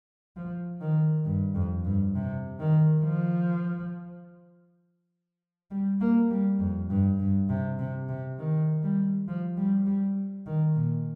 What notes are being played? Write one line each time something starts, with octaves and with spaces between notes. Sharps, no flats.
F3
D#3
G2
F2
G2
C3
D#3
F3
G3
A#3
G3
F2
G2
G2
C3
C3
C3
D#3
G3
F3
G3
G3
D#3
A#2